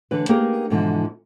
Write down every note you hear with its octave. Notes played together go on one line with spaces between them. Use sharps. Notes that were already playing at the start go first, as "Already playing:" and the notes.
D3 E3 A4 B4
A#3 B3 D#4 G4 G#4 A#4
G#2 B2 D3 E3 F3